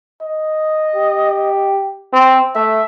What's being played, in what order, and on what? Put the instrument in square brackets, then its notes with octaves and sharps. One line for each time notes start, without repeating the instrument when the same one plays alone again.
[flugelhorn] D#5
[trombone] G4
C4
[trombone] A3 [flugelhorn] E5